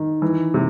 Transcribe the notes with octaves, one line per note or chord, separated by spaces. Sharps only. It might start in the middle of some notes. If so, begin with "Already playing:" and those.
Already playing: D#3
E3
C3